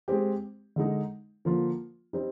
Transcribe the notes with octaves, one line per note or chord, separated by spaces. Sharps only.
G#3 C4 G4
D3 G#3 D#4
D3 F3 A#3 F4
G3 C4 D#4 G4